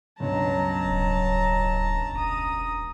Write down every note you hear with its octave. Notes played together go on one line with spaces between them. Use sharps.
C#2 G2 B2 F#3 A5 A#5
D1
E1 A#5 D#6